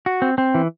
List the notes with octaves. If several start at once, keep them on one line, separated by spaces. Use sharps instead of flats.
F#4
C4
C4
E3